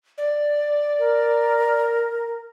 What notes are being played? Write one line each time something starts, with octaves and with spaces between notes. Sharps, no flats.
D5
A#4